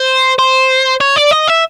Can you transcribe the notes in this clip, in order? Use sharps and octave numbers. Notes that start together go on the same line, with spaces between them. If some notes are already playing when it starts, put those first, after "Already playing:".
Already playing: C5
C5
C#5
D5
D#5
E5